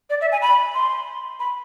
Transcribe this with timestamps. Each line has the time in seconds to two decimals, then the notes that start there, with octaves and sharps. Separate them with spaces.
0.10 D5
0.21 E5
0.32 G#5
0.42 B5
0.74 C6
1.39 B5